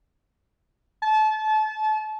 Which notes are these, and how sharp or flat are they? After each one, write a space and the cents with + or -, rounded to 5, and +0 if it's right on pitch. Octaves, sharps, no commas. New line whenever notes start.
A5 -30